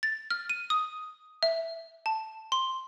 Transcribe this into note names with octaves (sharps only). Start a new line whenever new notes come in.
A6
F6
D#7
D#6
E5
A5
C6